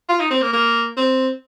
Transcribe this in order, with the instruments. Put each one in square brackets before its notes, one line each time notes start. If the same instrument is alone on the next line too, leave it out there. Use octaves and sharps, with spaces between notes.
[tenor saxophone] F4
D#4
C4
A#3
A#3
C4